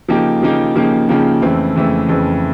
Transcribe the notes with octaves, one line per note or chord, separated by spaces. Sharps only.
C#3 F3 A#3 D#4 G4
C#3 F3 A#3 D#4 G4
C#3 F3 A#3 D#4 G4
C#3 F3 A#3 D#4 G4
F2 C#3 E3 A3 C4
F2 C#3 E3 A3 C4
F2 C#3 E3 A3 C4